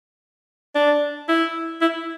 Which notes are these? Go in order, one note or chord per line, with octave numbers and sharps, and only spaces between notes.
D4
E4
E4